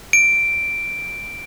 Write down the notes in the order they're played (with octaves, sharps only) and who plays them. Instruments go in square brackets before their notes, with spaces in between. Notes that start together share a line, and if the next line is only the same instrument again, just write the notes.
[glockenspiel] D7